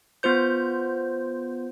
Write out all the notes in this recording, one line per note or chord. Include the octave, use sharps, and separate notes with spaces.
B3 F4 C5 G6